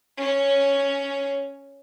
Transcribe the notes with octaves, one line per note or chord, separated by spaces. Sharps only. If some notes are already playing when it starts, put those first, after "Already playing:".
C#4 C#5